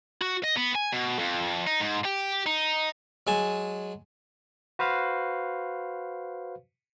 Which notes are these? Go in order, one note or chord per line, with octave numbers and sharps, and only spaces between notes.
F#4
D#5
B3
G#5
B2
F2
D#4
G#2
G4
D#4
F#3 G#3 G#5 A5
F#4 B4 C5 F5